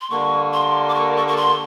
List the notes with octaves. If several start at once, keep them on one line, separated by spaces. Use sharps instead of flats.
C6
D3 G3 A#3 C#6
C6
D6
C#6
C#6
C#6
C6